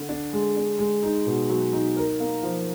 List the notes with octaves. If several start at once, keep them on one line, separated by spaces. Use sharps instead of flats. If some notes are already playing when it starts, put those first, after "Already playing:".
Already playing: D3
D4
G#3
D4
G#3
D#4
B2
F#3
D#4
A#4
A#3
F3